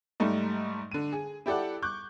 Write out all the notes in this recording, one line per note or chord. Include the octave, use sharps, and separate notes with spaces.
G#2 G3 A3 D#4
D3 D#7
G#4
E4 G4 A4 D5 F#5
C#6 D6 F#6 G6